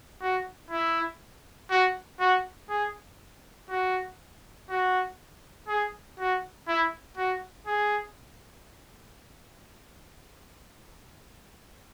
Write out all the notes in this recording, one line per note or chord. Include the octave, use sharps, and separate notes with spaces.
F#4
E4
F#4
F#4
G#4
F#4
F#4
G#4
F#4
E4
F#4
G#4